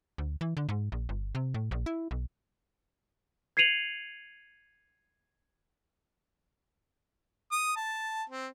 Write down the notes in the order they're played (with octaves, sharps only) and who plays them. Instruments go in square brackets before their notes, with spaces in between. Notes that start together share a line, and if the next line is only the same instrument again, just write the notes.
[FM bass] D2
E3
D3
G#2
A#1
G1
C3
A2
A#1
E4
B1
[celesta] G#6 C7 C#7 D#7 F7 F#7
[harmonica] D#6
A5
C4